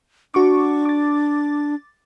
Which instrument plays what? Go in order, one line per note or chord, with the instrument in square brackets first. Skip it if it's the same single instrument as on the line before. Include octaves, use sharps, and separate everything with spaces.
[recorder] D4 [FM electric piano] F#4 C#6 D6
[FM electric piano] D6 A6